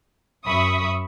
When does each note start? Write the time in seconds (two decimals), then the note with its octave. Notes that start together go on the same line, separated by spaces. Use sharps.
0.47 F#2 E5 B5 C#6 D#6